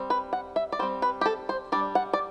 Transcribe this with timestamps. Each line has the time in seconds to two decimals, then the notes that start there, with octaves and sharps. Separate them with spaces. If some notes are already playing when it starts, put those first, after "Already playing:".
Already playing: G3 C4
0.10 B4
0.33 F#5
0.56 E5
0.72 D5
0.79 G3 C5
0.83 C4
1.02 B4
1.21 G4
1.26 A4
1.49 C5
1.72 G3 D4 D5
1.95 F#5
2.13 D5